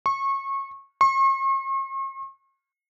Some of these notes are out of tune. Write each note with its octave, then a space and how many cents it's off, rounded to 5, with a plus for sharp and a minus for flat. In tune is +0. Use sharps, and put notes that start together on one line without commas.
C#6 -25
C#6 -45